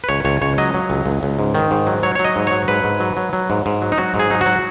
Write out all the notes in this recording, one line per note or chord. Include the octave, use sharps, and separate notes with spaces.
B4
C#2 C#5
C#2 C#5
C#2 C#5
F#3 D#5
F#3
C#2
C#2
C#2
G#2
D#3
G#2
F#3
F#3 C#5
F#3 C#5
D#5
G#2
F#3 C#5
G#2 B4
G#2
F#3
F#3
F#3
G#2
G#2
F#3
D#4
F#3 F#4
G#2 G#4
F#3 D#4
F#3 F#4